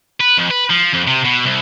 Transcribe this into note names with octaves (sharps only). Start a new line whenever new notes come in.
B4
F2
B4
F3
F2
C3
B2
C2